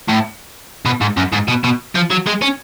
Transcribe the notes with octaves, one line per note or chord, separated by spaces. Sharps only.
A2
B2
G#2
F#2
G#2
B2
B2
F3
F#3
G#3
C#4